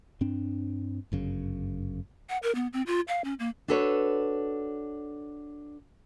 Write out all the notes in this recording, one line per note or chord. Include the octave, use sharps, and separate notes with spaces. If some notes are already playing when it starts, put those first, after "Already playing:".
G2 C4 D4
G1 F#2 C#3
F#5
A#4
B3
C4
F4
F5
C#4
A#3
D4 F#4 A4 B4 C#5